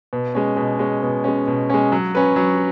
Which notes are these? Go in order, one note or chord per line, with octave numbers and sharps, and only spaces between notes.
B2
G#3 C#4
B2
G#3 C#4
B2
G#3 C#4
B2
G#3 C#4
F#3
C#4 B4
F#3